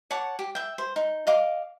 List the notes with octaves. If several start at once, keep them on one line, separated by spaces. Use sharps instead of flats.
C#5 F#5 A5 D6
G4
E5 G5
C5
D#4
D#5 F5 D6